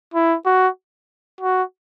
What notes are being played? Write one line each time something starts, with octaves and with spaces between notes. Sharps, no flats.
E4
F#4
F#4